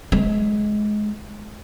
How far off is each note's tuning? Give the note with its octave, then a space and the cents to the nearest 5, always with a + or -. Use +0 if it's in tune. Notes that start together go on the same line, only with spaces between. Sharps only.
G#3 +20